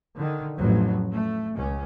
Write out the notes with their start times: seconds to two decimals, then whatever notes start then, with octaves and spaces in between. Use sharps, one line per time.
0.16 D3 D#3
0.57 A1 F2 F3 F#3
1.10 A3
1.53 C#2 C#4